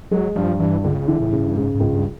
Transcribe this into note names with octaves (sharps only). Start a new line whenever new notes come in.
F#3 G#3
G2 F3
G2 E3
C#2 D3
C#3
D3 E3
A2
C#3
G2
G#2 C#3
G#2
C#2
G2